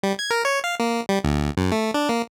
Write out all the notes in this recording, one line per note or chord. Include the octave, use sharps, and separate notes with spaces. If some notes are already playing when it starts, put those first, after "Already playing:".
G3
G#6
A#4
C#5
F5
A#3
G3
D2
F#2
A3
D4
A#3